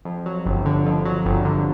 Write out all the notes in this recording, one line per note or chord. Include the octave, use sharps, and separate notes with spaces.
F2
F#3
G1
D3
F2
F#3
G1
D3